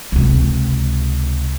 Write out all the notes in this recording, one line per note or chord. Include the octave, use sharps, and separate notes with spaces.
C#2 C3